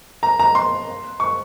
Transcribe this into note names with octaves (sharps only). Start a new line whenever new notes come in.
A#5
A#5
C6
C#6